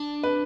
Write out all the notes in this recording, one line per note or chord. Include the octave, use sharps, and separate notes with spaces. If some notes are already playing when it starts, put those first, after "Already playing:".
Already playing: D4
B4